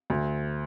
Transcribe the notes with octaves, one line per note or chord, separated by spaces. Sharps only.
D2